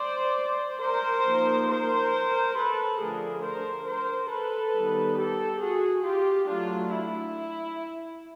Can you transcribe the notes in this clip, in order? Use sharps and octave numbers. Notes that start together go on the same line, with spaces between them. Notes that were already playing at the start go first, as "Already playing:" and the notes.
Already playing: C5 D5
A#4 C5
F3 A#3 D#4
A#4 C5
A4 B4
D3 F3 A3 D4 G#4 A#4
A#4 C5
A#4 C5
A4 B4
D#3 G3 B3 D#4
G4 A4
F#4 G#4
F4 G4
F#3 A3 D4 F4
E4